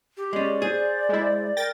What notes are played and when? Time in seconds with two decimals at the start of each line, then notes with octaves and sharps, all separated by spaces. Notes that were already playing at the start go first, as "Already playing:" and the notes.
0.17 G4
0.33 G#3 C#4 D5
0.62 G#4 C5
1.09 G#3 E4
1.57 A#4 G5 A6 A#6